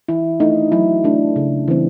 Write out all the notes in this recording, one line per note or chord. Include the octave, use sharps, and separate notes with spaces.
E3 E4
A3 D4 D#4
F#3 E4
A3 D4
C#3
E3 G3 C4